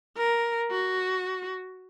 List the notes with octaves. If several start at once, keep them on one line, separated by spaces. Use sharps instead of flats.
A#4
F#4